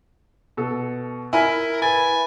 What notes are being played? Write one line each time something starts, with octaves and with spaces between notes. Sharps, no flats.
B2 A4
E4 A#4 G#5 B5 F6
B4 G#5 A6